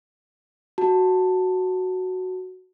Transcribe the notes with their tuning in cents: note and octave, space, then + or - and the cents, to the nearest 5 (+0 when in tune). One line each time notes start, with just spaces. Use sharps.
F#4 +0 A5 +10